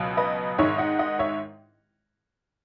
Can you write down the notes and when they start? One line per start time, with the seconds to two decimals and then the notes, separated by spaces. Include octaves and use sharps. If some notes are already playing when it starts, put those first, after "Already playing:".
Already playing: C#2 B2 F#3
0.17 B4 D#5
0.58 G#2 D#3 G#3 C#5 E5
0.78 D#5 F#5
0.99 D#5 F#5
1.19 C#5 E5